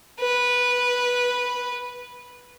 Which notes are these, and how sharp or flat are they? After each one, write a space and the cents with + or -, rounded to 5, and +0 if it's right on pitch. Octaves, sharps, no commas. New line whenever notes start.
B4 -10